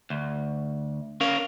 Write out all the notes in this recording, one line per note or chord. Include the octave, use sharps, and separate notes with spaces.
D2
C#4 A#4 F5